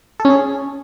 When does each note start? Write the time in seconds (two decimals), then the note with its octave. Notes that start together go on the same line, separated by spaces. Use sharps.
0.20 A4
0.25 C#4
0.30 G#4